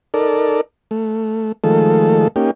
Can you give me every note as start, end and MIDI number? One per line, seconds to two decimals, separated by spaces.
0.14 0.61 63
0.14 0.61 69
0.14 0.61 70
0.14 0.61 74
0.91 1.52 57
1.64 2.28 51
1.64 2.28 53
1.64 2.28 56
1.64 2.28 57
1.64 2.28 69
2.36 2.51 58
2.36 2.51 61
2.36 2.51 63
2.36 2.51 67